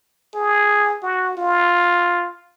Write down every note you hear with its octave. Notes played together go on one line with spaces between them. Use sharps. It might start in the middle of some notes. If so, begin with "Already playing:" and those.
G#4
F#4
F4